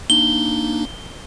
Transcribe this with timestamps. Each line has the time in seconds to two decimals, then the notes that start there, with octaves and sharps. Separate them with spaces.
0.10 A#3 D4 D#4 G7